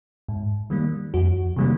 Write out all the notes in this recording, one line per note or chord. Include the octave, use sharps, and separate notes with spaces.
G#2
D#3 G3 A#3
F2 F#4
C3 D#3 G3 A#3